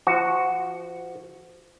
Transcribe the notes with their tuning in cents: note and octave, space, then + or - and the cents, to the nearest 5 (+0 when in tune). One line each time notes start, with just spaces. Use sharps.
F3 -25 F#4 +0